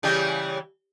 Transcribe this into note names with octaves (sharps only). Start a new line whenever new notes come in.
C#3 E3 G3